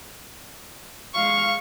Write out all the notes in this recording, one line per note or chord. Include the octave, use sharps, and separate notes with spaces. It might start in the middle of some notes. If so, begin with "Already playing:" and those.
G#3 F5 C#6